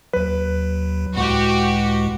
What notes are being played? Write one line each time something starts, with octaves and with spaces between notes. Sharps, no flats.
D#2 F#3 B4
C#2 A2 G#3 F#4 G4